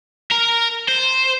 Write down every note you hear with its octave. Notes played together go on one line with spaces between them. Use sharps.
A#4
C5